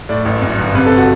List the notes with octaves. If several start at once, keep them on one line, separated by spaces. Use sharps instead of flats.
A2 D5
A1
F#2
G1
C3 B4
A4
F#4